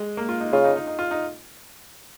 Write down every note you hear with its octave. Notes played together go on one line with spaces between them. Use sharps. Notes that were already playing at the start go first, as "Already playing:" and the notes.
Already playing: G#3
A#3
F4
D#4
C#3 F4
D#4
D#4
D#4
F4
D#4